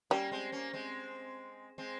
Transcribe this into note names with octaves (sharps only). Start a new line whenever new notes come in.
G3 A#3 C#4
G#3 C4
A#3 C#4
G#3 C4
G#3 C4